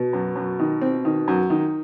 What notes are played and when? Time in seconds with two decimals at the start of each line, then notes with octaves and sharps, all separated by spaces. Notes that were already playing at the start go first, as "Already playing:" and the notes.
Already playing: B2
0.13 F#2
0.36 F#2
0.60 D#3
0.81 C4
1.05 D#3
1.28 F#2
1.50 D#3